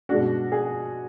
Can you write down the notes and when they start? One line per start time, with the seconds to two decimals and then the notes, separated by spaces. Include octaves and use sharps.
0.09 B2 G#3 D4 F#4
0.52 G#4